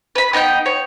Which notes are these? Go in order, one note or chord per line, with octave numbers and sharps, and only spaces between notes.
B4 B5
B3 D#4 D#5 G5
C#5